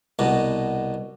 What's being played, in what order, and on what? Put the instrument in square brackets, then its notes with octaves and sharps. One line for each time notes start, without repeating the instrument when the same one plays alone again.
[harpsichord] C2 B2